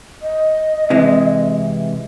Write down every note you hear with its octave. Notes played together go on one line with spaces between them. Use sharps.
D#5
C3 E3 G#3